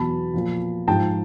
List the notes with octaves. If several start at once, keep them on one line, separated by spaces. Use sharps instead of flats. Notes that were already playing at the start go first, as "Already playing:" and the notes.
Already playing: E2 B2 F#3 A5 B5
A#2 F3
G#2 F3 G5 A5